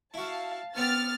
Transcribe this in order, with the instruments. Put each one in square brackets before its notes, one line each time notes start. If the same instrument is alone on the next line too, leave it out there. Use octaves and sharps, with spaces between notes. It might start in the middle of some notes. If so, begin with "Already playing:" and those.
[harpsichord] E4 F#4 [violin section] F5 A5
[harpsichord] B3 C4 G4 [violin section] F6 A6